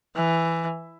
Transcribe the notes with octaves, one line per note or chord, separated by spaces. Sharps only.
E3